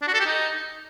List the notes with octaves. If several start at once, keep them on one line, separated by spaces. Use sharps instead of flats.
D4
F#4
A4
G4
D#4